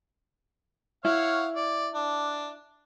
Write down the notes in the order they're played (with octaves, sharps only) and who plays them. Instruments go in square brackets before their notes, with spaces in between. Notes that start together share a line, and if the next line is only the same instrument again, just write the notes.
[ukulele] E4 [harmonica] C#5 F5 F#5
[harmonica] D5
D4